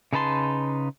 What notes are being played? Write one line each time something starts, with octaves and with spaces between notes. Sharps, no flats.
C#3 D#4 B4 A5 C6